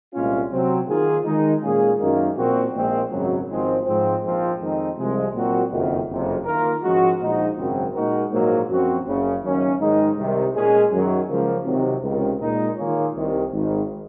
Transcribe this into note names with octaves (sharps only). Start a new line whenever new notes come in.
C2 A#2 G#3 C#4 F4
C3 F#3 C4
D#3 A#3 F4 G#4
D#3 G#3 D#4
A#2 G#3 C#4 F4 G#4
F#2 D#3 A#3
A#2 F3 C4 F#4
A#1 A#2 F3 G#3 C4
G#1 F#2 C#3 F#3
G#1 G#2 F3 G#3 C4
G#2 F3 C4
A#1 G#2 F3 C4 F4
F2 D#3 G#3 C4 D#4
C2 C3 F3 G#3
A#2 F#3 C4 F#4
F#1 F2 D#3
F#1 F2 C3
D#3 A#3 F4 A#4
G#2 F3 G#3 C#4 F#4
A#1 A#2 F3 G#3 D#4
G#1 F#2 C#3 F#3 C4
A#2 G#3 D#4 F#4 A#4
A#1 G#2 F#3 A#3
F#2 F3 C4 F#4
F#1 F#2 C#3
F#1 F#2 D#3 A#3 C#4
G#2 D#3 G#3 D#4
C2 C3 D#3
A#2 G#3 C#4 G#4
F#2 D#3 F#3
C#2 C#3 F3 A#3
C3 D#3 F#3
C#2 C3 D#3
A#2 G#3 D#4
D#3 A#3 F4 G#4 C#5
C2 C3 D#3
G#1 G#2 D#3